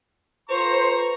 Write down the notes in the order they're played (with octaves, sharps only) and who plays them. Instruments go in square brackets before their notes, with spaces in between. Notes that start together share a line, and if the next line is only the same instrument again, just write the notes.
[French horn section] F4 A4 B4 [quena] C5 [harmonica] A#5 C#6